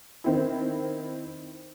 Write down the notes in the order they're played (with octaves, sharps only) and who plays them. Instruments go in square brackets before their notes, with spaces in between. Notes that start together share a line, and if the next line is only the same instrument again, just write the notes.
[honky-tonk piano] D#3 C4 E4